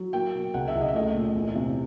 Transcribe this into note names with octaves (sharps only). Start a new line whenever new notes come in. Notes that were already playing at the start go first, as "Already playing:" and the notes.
Already playing: F#3
A#3 G5
B2
C#2 F#5
E5
C#2
D#5
E5
A3 D#5
A#2
E2
C3